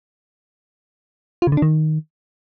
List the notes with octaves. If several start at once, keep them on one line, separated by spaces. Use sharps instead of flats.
F4
C#3
D3
D4
D#3